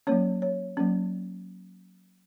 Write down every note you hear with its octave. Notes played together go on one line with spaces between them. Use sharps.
F#3 A#3 C#4 C#5
C#5
F#3 A#3 C#4